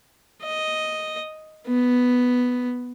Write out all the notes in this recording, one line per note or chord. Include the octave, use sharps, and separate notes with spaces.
D#5
B3